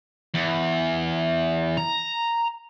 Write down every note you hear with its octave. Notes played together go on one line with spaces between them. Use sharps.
E2
A#5